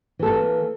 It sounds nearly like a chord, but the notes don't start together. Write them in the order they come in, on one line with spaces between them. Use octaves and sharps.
E3 A4 A#3